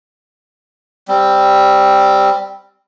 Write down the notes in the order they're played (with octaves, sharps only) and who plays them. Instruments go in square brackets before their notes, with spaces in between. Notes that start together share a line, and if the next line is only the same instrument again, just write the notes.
[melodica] G3 C4